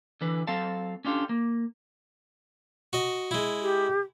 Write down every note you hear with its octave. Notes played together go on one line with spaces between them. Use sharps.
D3 E3 B4
F#3 C4 A4 F5 A5
C#4 D4 F4 G4 A4
A#3
F#4 D#5
G#3 E4
G4